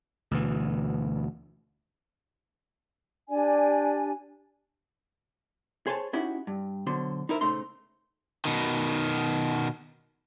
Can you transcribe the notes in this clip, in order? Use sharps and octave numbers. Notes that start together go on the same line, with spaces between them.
D2 B2 E3
D4 G4 D5 G#5
G#4 C5 C#5 G#5 A5
C#4 D#4 E4 F#4 G4
G2
B2 D3 F#3 C5
D#4 E4 A#4 C5
A#2 C#3 A3 D#4 C5 C6
B2 D#3